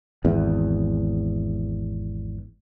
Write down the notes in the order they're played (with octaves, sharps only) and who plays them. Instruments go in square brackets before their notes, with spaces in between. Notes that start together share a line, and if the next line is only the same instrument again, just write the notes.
[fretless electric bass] G#1 E2